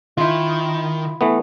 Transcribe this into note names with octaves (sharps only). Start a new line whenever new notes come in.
D#3 E4 F4
E3 A3 B3